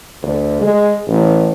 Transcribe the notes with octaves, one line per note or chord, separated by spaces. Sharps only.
D2
G#3
A1